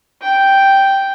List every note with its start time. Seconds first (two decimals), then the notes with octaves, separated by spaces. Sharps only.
0.22 G5